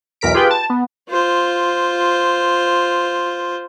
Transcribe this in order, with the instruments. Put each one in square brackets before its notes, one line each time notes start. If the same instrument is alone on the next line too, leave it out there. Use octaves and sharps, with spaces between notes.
[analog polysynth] B1 E2 A#4 B6 D7
F4 G4 G#4 B4 G5
A5
B3
[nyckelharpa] F4 C5